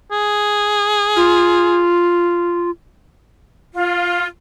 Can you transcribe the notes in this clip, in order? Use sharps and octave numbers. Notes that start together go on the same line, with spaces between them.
G#4
F4
F4